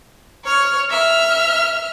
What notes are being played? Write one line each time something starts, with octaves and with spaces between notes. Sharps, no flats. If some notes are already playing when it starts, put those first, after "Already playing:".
C#5 F6
E5 F6